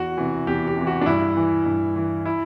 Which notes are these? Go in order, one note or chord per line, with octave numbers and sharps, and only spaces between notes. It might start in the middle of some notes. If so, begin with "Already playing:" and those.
Already playing: E2 F#4
C3 E3
E2 G4
G4
C3 E3
F#4
D4
G2 E4
E3
G2
E3
E4